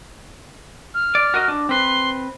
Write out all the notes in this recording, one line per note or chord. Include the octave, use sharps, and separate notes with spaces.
F6
D5
F#4 A#4 D#5
D4
C4 B4 C6